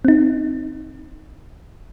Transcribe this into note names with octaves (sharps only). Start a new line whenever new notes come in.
C4 D#4